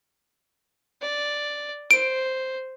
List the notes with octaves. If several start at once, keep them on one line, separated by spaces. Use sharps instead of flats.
D5
C5 D7